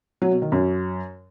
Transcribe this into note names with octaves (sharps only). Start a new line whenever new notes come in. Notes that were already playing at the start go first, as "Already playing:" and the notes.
F#3
B2
D#3
F#2